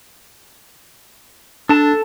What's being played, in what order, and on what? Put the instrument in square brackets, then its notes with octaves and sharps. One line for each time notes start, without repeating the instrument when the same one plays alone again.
[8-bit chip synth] D4 [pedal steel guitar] A4 A5